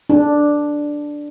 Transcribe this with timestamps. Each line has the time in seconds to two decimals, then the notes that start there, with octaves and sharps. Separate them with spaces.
0.10 D4